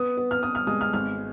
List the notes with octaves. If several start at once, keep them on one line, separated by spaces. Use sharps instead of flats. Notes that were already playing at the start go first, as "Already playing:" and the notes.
Already playing: B3 D#6
B3
F6
B3 D#6
F6
G#3 D#6
F6
G#1 F6